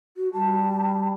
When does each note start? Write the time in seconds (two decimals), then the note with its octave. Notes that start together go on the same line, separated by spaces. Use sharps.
0.17 F#4
0.34 G3 A5